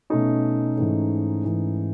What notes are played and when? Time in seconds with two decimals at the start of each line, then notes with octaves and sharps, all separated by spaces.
0.10 B2 A3 C#4 D#4
0.77 G#2 E3 A3 C#4
1.44 G#2 E3 A3 C#4